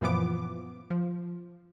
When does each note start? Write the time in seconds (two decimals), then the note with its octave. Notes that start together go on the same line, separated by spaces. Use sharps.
0.01 F#2 A#2 E3 F3 B3 D6
0.90 F3